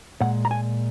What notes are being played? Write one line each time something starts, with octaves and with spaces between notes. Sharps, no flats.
A#2 G#3 F#5
A#5
G#5